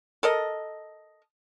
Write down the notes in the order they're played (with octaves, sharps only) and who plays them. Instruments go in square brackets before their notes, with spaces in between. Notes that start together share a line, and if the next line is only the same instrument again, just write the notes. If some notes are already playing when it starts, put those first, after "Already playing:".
[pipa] A4 A#4 D#5